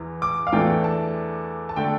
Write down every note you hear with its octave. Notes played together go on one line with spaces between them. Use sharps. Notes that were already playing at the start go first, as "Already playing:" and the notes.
Already playing: E2 E3
D6
F5
E2 E3 A3 D4 G5
A5
A5
D3 A3 D4 G5